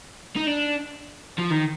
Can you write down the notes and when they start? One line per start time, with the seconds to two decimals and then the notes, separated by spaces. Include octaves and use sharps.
0.36 D#4
0.47 D4
1.39 F3
1.51 D#3